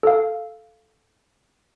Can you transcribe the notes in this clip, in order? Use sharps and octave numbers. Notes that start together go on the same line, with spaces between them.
A4 F5